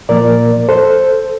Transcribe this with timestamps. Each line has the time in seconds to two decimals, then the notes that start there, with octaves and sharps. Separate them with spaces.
0.09 A#2 F3 A#3 A#4 D5
0.69 A4 C5